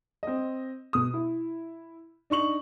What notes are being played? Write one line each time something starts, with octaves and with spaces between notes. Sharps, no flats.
C4 D#5
B2 D#6
E4
D4 D#4 C#6 F#7